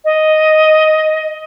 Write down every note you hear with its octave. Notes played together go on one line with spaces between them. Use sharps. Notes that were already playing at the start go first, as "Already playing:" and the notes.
D#5